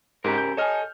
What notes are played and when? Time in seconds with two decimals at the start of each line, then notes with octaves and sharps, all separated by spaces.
0.24 G#2 C#3 G4 A#4
0.38 G6
0.57 A4 C#5 D#5 G#5 F6